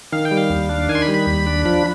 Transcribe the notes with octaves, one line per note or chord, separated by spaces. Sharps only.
D#3 F5
G5
G3
F5
D#2
D4
D#3 G#5
C6
B5
G3
B5
D#2
D4
F3 B5